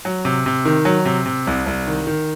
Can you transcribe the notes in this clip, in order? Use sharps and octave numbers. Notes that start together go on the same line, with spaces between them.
F#3
C3
C3
D#3
F#3
C3
C3
C2
C2
D#3
D#3